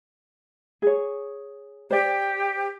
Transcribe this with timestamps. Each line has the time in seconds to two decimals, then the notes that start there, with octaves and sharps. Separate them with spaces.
0.82 G#4 C#5
1.91 G4 C5 D5